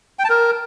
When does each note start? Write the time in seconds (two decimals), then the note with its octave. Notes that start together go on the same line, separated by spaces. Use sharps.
0.19 G5
0.24 A5
0.30 A#4